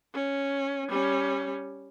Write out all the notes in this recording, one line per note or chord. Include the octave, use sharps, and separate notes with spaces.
C#4
G3 C#4